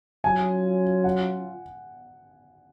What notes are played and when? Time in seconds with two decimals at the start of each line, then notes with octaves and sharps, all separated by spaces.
0.24 F#3 C#4 F4 G#5
1.04 F#5